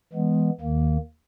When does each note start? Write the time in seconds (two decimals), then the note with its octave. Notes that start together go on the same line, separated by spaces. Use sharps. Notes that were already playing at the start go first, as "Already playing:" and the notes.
0.14 E3 G#3 B3
0.60 D#2 D#3 A#3